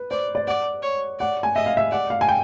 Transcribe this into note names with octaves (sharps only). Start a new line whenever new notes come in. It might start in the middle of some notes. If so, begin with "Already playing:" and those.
Already playing: B4
C5 D5
D5
D5 F#5
C#5
D5 F#5
G#5
D#5 E5
F5
E5
D5 F#5
F5
G#5
G5